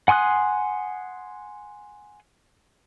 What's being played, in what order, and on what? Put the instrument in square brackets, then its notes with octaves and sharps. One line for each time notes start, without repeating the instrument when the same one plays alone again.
[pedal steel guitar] F#5 G#5 C6 D#6 F#6